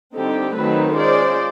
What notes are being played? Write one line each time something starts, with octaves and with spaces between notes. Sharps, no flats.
D3 G3 C4 D#4 G4 A4
D#3 F#3 A3 C4 A4 B4
G#3 C#4 F4 C5 D5